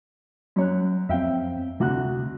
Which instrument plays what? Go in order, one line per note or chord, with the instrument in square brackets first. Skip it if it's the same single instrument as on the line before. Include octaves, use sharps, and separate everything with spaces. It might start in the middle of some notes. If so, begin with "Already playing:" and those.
[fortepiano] F#2 C#5 F#6
[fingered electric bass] F2 C4 [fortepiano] E5 F5 G5
[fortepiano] D2 F#4 F#6 [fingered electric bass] C3